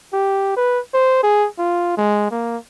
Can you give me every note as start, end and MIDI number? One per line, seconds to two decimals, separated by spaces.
0.13 0.52 67
0.57 0.80 71
0.94 1.20 72
1.23 1.47 68
1.59 1.96 65
1.97 2.28 56
2.31 2.57 58